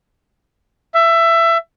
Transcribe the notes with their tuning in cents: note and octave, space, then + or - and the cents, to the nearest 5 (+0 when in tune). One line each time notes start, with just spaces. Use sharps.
E5 +20